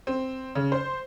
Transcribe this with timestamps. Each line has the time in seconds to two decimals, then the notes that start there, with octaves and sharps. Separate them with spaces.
0.07 C4
0.55 C#3
0.72 C5